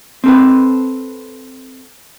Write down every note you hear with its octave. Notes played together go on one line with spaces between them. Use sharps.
C4 A4 B4